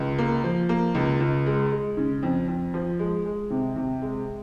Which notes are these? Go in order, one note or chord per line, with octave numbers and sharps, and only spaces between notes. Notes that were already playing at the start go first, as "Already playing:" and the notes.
Already playing: C#2
A#3
F3
A#3
C#2
C#2
G#3
G#3
C#3
F2
F2
F3
G#3
G#3
C3
C3
G#3